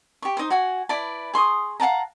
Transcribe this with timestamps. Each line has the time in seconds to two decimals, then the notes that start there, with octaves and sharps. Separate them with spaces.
0.22 G4 C#6
0.37 D#4 C5
0.50 F#4 F#5 G#5
0.89 E4 B4 D5 A5
1.34 G#4 C6 C#6 D#6
1.80 F5 F#5 A5 A#5